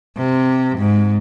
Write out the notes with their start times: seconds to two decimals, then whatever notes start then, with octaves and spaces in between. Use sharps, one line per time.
0.17 C3
0.79 G#2